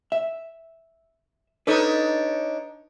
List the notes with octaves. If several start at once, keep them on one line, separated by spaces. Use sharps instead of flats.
E5
D4 D#4 A4 B4 C#5